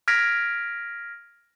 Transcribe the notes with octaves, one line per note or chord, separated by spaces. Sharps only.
F6 G#6 A#6 B6 D7